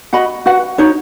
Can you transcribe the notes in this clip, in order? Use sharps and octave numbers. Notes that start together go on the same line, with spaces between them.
F#4 D#5 F#5 B5
F#4 B4 F#5
D#4 F#4 C#5